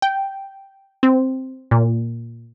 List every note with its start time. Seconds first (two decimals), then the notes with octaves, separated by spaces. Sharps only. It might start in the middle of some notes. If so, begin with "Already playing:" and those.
0.02 G5
1.03 C4
1.71 A#2